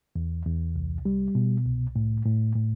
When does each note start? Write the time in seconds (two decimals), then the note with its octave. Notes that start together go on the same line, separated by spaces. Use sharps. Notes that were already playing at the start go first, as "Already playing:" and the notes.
0.16 E2
0.46 E2
0.76 C2
1.05 G3
1.35 B2
1.66 C2
1.96 A2
2.25 A2
2.56 A2